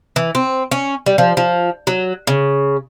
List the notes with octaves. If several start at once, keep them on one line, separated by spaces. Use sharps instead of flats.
E3
C4
C#4
G3
F3
F3
F#3
C#3